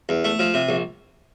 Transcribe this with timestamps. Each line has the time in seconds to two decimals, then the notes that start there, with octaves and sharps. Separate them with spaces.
0.09 E2
0.24 A3
0.39 F3
0.54 C3
0.69 A#1